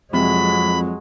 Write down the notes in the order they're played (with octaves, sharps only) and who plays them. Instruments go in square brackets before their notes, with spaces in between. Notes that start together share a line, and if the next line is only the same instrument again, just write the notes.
[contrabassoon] F2 [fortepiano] C3 [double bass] F#3 G#3 [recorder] B5